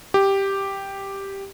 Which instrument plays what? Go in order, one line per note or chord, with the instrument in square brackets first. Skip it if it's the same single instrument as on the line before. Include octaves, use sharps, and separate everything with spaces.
[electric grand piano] G4